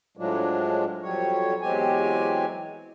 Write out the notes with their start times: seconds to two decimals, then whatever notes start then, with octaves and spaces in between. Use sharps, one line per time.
0.17 A2 F3 F#3 G#3 D4
1.02 F2 F#3 G3 C#5
1.62 E2 F#3 G#3 C4 G4 G#5